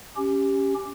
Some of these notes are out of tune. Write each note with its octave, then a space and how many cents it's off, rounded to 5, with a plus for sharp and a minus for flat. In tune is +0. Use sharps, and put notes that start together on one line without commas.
C#4 +0 G4 +0